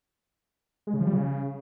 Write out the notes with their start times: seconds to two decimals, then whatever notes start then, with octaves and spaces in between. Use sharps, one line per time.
0.87 G#3
0.94 C#3
1.00 F3
1.07 G3
1.13 C#3